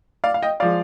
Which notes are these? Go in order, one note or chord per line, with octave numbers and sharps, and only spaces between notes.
D5 F5
F5
D#5 G5
F3 G#3 D5 F5